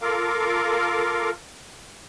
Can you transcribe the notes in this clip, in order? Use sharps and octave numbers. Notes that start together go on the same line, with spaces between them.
F4 A4 A#4 F5 D6